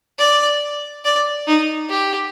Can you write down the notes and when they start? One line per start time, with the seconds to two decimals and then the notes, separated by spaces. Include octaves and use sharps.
0.19 D5
1.05 D5
1.47 D#4
1.89 G4